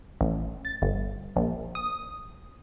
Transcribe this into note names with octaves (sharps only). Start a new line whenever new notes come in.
A1
A6
G1
A#1
D#6